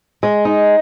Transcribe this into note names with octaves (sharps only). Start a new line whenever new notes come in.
G#3
D#4